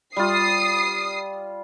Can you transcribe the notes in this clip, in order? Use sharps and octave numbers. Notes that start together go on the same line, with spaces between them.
G3 F4 D#6 C7